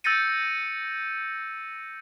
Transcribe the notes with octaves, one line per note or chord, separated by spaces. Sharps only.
E6 G6 A6 A#6 C#7 D#7